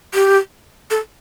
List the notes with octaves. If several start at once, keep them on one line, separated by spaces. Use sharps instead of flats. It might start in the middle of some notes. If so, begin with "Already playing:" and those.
G4
A4